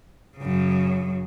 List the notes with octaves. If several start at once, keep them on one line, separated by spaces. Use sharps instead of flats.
F#2 C#3